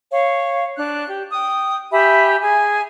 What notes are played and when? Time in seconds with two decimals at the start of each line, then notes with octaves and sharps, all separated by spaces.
0.12 C#5 F5
0.77 D4 F#6
1.07 G4
1.32 G5 D#6
1.92 G4 E5 G#5 B5
2.41 G#4 G#5